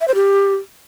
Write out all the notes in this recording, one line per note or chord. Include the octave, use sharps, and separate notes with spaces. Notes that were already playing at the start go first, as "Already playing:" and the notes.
E5
C5
G4